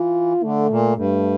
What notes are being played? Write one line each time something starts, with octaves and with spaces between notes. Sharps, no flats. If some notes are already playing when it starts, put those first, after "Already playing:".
Already playing: E3 F4
D3 A3
A#2
G2 A3